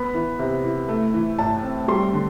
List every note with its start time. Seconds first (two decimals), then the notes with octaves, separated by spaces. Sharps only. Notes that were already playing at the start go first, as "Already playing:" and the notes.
Already playing: B3 B5
0.14 E3
0.39 C3
0.64 E4
0.88 A3
1.14 E3
1.39 A2 A5
1.63 C4
1.88 G3 C6
2.13 D3